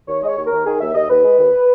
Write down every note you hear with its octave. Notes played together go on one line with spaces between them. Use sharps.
D#2 C#5
G#3 C#5 D#5
D#2
A#4
D#2
D#3 G#4
D#2 E5
D#2 D#5
D#2 B4
G#3
D#2